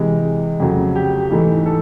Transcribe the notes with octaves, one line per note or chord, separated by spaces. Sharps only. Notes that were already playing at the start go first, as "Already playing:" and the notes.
Already playing: C3 E3 G#3
F2 C#3 F#3 A3
G4
G#2 E3 A3
A4